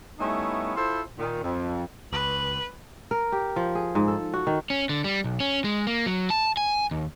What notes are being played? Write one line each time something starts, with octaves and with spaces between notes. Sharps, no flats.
G3 A3 B3 C#4 D#4 E4
E4 F4 A4 C5
A#2 D#3
F2
C#2 B4 F#7
A#4
G4
F3
G#4
G#2
A4
F#4
D#3
C#4
D3
G3
B1
C#4
G#3
A#3
F#3
A5
G#5
D#2